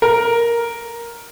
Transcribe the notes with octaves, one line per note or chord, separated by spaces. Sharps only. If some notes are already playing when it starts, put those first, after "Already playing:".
A#4